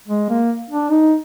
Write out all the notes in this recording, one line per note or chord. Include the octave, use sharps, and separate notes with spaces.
G#3
A#3
D4
D#4